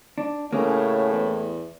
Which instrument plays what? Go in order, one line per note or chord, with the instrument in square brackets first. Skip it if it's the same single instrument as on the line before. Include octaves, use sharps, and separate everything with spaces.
[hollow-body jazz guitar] D4
[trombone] A2 [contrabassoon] C#3 [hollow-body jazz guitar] A#3 [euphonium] C#4
[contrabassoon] E2